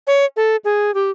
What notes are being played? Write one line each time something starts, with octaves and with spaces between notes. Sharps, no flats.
C#5
A4
G#4
G4